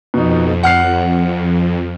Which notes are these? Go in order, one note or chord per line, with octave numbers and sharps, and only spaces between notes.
F2 B2 D#4
F#5 F6 C7